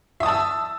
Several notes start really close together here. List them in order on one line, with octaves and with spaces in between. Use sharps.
E5 D#6 A5 E6